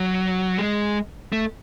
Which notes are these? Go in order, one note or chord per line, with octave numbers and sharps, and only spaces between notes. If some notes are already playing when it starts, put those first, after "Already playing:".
Already playing: F#3
G#3
A3